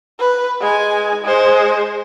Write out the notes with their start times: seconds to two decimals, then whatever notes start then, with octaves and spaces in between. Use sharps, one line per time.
0.20 B4
0.61 G#3 G#5
1.24 G#3 C5